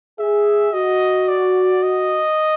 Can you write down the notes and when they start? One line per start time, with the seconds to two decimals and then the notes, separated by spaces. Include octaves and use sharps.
0.19 G#4 E5
0.73 F#4 D#5
1.28 D5
1.83 D#5